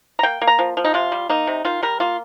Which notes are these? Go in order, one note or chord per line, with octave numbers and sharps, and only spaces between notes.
A#5
A#3 G5
A#3
A#5
F3
F3
D#4
C3 F4
G3
A#3 D#4
C3
D#3 F4
G3 A#4
A#3 F4